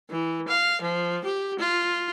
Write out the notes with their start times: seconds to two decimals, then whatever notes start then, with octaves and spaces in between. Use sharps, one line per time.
0.11 E3
0.48 F5
0.81 F3
1.25 G4
1.59 F4